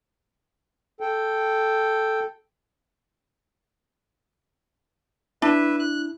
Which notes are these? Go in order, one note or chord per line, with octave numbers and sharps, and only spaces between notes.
A4 G5
D4 E4 B4 E5
F#6